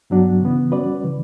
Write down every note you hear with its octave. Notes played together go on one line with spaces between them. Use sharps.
G2 F#3 B3 D4 F#4
C#3 E3 B3
G3 C#4 F#4 B4 D5
C#3 E3